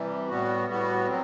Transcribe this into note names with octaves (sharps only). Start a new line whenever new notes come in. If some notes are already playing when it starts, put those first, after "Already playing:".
Already playing: C3 E3 G3
A2 G3 B3 F#4
A2 G3 B3 F#4
F#3 C4